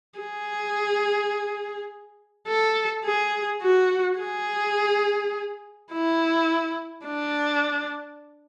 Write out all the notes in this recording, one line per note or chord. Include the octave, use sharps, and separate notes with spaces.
G#4
A4
G#4
F#4
G#4
E4
D4